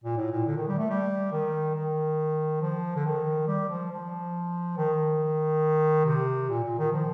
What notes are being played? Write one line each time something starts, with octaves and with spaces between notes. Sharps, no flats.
A#2
A2
A#2
D3
D#3
G3
A3
G3
D#3
D#3
F3
D3
D#3
G3
F3
F3
D#3
C3
A#2
A#2
D#3
F3